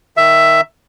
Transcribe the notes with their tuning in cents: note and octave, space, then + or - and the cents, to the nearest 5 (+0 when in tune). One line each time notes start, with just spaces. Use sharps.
D#3 +0 E5 +10